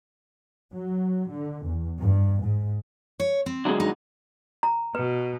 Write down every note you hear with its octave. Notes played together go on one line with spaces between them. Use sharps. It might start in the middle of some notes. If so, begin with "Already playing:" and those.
F#3
D3
E2
G2
G#2
C#5
C4
D3 F#3 G#3
D#4
A#5
B2 B4